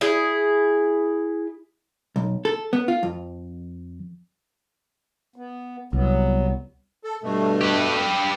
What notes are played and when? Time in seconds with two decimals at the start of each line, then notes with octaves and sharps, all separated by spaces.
0.01 E4 G#4
2.16 B1
2.45 A4
2.73 B3
2.88 F4
3.03 F2
5.36 B3
5.93 C2 F#3 B3
7.03 A4
7.23 G2 B2 A3
7.61 G4 B4